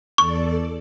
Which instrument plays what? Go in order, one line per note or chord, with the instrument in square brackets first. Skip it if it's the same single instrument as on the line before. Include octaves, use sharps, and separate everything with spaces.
[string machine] E2 A4 D5 [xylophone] C#6